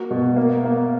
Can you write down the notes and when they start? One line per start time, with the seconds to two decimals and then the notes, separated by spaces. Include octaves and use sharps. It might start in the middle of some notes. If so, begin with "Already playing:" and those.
Already playing: A#3 F#4
0.11 B2
0.36 A#3
0.64 A#3